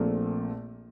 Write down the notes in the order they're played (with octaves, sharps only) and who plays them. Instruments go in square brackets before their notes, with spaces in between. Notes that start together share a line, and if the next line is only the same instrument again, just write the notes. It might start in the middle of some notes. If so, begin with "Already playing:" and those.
Already playing: [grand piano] A#1 A#2 A3 C4